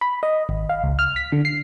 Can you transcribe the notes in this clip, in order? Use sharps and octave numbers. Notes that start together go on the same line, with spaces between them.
B5
D#5
G#1
F5
C#2
F6
B6
D3
C7